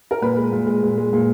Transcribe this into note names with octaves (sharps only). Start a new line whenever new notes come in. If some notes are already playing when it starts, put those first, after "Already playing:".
A#4
A#2 B4
G#3
A#2
G#3
A#2
G#3
A#2